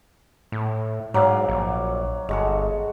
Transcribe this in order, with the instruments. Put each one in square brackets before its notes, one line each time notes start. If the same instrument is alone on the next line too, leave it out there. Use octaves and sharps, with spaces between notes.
[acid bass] A2
[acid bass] G#2 [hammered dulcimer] F#3 D5 F5
[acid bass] A#1
[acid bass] G1 [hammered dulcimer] G#3 F#4 A4